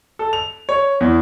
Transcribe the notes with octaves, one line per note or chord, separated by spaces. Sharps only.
A4
F7
C#5
E2